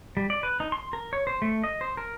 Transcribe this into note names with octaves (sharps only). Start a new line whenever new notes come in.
G3
D5
B4
D#4
C6
A#4
C#5
C5
A3
D#5
C5
A#4